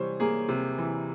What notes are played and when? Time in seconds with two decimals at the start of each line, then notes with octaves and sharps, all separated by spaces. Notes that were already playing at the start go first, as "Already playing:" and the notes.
Already playing: C3 E3 G3 C5 C#5
0.20 A#3 G#4
0.49 C3
0.78 E3